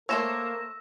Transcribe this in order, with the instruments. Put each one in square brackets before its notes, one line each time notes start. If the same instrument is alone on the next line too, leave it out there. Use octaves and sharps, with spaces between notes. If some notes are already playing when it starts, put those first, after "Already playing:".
[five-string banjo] A3 C5 C#5 [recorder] A#3 [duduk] A#4 [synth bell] E6 A#6 E7